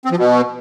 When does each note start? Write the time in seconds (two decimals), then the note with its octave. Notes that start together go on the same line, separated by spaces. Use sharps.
0.05 C4
0.12 F3
0.18 B2